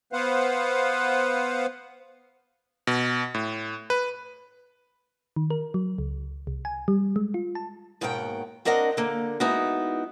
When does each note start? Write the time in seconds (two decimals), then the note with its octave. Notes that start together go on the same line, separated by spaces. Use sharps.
0.13 B3 B4 C5 F5 F#5
2.87 B2
3.35 A2
3.90 B4
5.36 D#3
5.50 A#4
5.74 F#3
5.98 C#2
6.47 C2
6.65 G#5
6.88 G3
7.16 G#3
7.34 F4
7.55 A5
8.01 D#2 G#2 B2 A#4 F#5 G5
8.65 C4 D4 A#4 D#5 F#5
8.97 D3 A#3
9.40 G#3 B3 D#4 E4 F#4